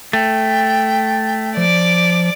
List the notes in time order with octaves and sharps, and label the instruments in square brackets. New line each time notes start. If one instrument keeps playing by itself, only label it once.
[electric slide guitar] A3 [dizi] G5
[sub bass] F3 [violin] D5 D6